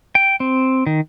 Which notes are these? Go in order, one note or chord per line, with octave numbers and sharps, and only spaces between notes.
G5
C4
D#3